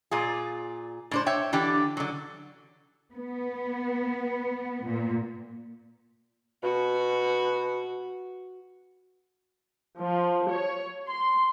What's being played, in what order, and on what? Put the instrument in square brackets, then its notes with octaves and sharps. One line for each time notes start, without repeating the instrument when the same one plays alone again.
[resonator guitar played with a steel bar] A#2 F4 G#4
A2 D4 C5
C#5 E5 G5
D3 E3 D4 G4
D3 F#3
[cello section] B3
A#2
[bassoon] B2 [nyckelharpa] F#4
[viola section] F3
C#5
C6